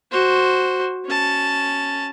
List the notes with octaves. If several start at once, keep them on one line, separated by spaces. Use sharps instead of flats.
F#4 C5
C#4 A5